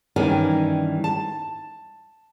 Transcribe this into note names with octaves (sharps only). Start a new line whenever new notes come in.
G2 D#3 E3 G3 C#4 G#5
A5